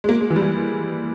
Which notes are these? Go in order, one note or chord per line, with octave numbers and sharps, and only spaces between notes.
G#3
A#3
G#3
E3
G3
E3